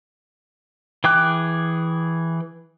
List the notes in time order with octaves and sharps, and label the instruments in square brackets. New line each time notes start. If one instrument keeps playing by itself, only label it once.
[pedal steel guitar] E3 G#4 G5 D6 F#6